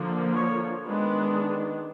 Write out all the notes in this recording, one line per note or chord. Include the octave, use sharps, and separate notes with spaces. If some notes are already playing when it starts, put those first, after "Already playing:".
Already playing: D3 F3 A#3
C#5
D#3 G#3 B3 D4 B4